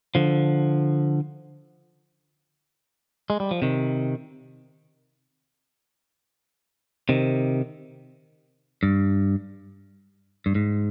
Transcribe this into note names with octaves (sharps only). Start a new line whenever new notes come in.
D3 F3
G#3
G3
F3
C3 D#3
C3 D#3
G2
G2
G#2